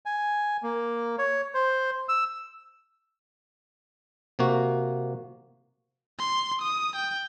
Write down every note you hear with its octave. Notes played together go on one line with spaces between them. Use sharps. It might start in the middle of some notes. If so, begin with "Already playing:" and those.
G#5
A#3
C#5
C5
E6
C3 A#3 F#4
C6
D#6
G5